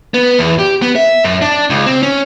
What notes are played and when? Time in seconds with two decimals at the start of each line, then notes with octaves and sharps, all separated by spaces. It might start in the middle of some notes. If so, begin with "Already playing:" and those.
0.14 B3
0.39 E2
0.59 G4
0.82 B3
0.96 E5
1.24 F#2
1.41 D4
1.70 C#2
1.87 C4
2.03 C#4